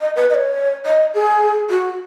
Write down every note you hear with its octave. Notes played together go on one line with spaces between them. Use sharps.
D#5
B4
D#5
C#5
D#5
G#4
F#4